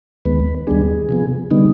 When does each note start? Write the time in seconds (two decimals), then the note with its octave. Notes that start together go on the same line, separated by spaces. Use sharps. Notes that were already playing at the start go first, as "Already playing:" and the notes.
0.25 D#2 D#3 G#3 B3 B4
0.67 D#2 D#3 G3 B3 D4 G#4
1.09 C3 F3 B3
1.51 D3 G3 B3 D#4